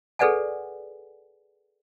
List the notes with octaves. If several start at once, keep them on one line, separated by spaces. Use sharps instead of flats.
G#4 A4 B4 D5 F#5 G#5